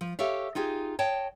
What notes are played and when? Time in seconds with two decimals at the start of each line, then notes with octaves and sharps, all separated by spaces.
0.01 F3
0.19 G4 A4 C#5 E5 F5
0.55 D#4 F4 G4 G#4
0.99 C#5 D#5 G5 A5